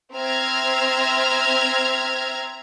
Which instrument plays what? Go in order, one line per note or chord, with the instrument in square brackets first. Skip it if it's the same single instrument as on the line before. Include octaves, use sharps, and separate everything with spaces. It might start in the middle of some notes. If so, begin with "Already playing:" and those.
[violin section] C4 E5 A#5 F6 G#6